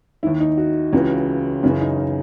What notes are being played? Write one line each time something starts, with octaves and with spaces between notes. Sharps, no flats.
D#2 D#3 E4
D#4
F#4
C#2 C#3 E3 F#4
F#2 C#3 E3 F#4
D#4
D#4